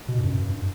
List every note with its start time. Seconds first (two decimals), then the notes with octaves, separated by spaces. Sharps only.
0.08 B2
0.18 G2
0.24 F#2
0.37 G2